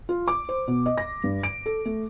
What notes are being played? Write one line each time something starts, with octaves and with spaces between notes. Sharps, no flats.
F4
D6
C5
B2
D#5
A#6
G2
D7
A4
A3